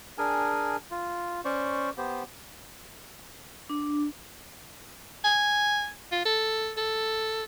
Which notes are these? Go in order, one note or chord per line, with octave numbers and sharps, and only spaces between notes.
D4 G#4 A#4 G#5
F4
C#4 C5 D5 C#6
B3 G4 C5
D4
G#5
F4
A4
A4